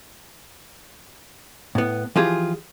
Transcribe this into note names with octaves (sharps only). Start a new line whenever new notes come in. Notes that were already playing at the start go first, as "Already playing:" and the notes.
A2 B3
E3 F3 F4 G4 G#4